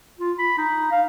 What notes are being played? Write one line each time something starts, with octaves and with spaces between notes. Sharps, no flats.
F4
B5
D#4
F5